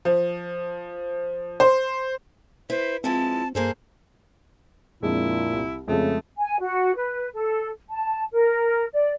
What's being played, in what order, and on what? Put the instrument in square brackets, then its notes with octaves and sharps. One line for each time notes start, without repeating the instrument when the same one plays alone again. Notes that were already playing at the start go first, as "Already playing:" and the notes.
[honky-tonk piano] F3
C5
[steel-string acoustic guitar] E4 B4 [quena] C5
[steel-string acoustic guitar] F3 G#3 E4 [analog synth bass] C4 [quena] A5
[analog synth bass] G2 [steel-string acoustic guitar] A#3 G#4 A4 [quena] C5
[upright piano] F2 G#3 D4 [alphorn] A#2 [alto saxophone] E4
[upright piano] C2
[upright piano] F2 G#3 [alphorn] C#3 [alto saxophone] A3
[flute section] G#5
F#4
B4
A4
A5
A#4
D5